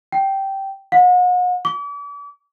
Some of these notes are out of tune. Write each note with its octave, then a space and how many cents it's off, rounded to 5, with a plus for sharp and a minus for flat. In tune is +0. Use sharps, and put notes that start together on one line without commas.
G5 -10
F#5 -40
D6 -40